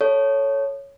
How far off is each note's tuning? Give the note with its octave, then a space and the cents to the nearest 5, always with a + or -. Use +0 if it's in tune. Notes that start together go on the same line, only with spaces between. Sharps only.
A4 +0 C#5 +0